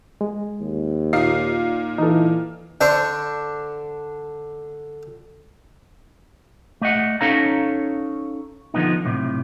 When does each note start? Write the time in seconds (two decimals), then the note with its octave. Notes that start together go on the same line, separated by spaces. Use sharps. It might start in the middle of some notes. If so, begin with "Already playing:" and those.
0.21 G#3
0.61 D#2
1.13 A#2 D#4 F5 C7
1.98 E3 D#4 A4
2.81 D3 D4 C5 C#6
6.81 A3 D#5 F#5
7.21 C#4 D#4 A4 C#5 F5 A#5
8.74 D3 F3 A3 B3 D#4
9.04 B1 A2 C3